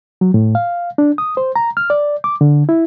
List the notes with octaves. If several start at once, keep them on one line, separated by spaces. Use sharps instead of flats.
F#3
A2
F5
D4
D#6
C5
A#5
F6
D5
D6
D3
E4